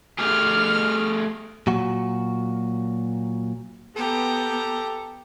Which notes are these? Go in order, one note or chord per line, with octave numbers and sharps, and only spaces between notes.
A3 G4 G#4 F6
A#2 F#3 F#4
B3 G4 A4 A#5